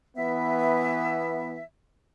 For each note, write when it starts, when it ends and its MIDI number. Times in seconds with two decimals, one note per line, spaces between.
0.17 1.58 52
0.17 1.58 59
0.17 1.62 76